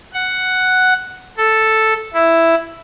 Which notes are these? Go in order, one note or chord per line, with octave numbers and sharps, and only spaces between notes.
F#5
A4
E4